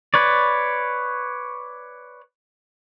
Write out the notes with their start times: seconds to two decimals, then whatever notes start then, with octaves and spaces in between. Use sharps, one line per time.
0.14 B4 C#5 D5